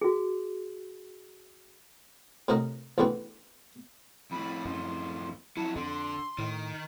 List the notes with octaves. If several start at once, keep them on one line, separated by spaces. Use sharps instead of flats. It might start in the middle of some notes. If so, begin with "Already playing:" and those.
F#4 G#4
A2 C3 A3 F#4 A#4 D#5
A1 E2 D3 E3 C4 F#4
F2 A2 B5
F#2 C6
F2 F#3 E4 A5
F2 D3 C6
A2 D#3